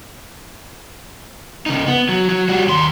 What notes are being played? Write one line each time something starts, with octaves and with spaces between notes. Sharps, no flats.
C#3 D#4
B3
F#3
F#3
G3 F#4
D#2 C6